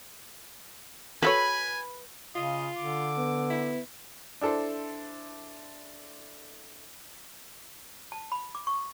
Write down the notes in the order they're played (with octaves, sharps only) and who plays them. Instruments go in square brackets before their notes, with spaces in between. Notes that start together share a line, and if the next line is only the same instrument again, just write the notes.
[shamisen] F#4 A4 C#5 [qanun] B4 [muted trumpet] G#5
[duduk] C#3 [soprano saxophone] F4 [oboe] D#5
[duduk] D3 [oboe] D6
[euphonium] B3
[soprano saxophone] E4
[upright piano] D4 E4 A4 C5
[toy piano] A5
B5
D6
C#6